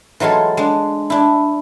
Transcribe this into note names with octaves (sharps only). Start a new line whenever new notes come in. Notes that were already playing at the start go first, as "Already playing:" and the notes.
E3 F#3 G#3 F4 A4
G#3 D4
D4 E4